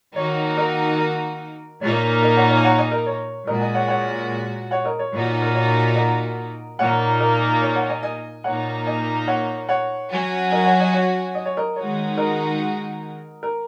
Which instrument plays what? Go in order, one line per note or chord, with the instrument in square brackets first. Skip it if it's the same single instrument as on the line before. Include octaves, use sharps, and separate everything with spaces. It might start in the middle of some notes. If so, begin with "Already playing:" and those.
[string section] D#3 A#3 D#4 F#4 [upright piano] C#5
[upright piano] A#4 D#5
A#4
[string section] A#2 A#3 D#4 [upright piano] C#5
[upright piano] A#4 D#5
C#5 F#5
C#5
G#5
C#5 F#5
D#5 G#5
A#4 D#5
C#5
[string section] A#2 G#3 F#4 [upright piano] A#4 D#5
[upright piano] D#5 G#5
C#5 F#5
C#5 F#5
C#5 F#5
A#4 D#5
C#5
[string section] A#2 A#3 D#4 F#4
[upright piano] A#4
C#5
A#4 D#5
[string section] A#2 A#3 D#4 [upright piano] C#5 F#5
[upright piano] A#4 D#5
C#5
C#5 F#5
D#5 G#5
D#5 G#5
[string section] A#2 A#3 D#4 [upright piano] C#5 F#5
[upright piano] D#5 G#5
C#5 F#5
C#5 F#5
[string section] F#3 C#4 F#4
[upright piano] A#4 D#5
C#5 F#5
D#5 G#5
C#5 F#5
D#5
C#5
A#4 D#5
[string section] D#3 G#3 D#4 F#4 [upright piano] C#5
[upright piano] A#4 D#5
A#4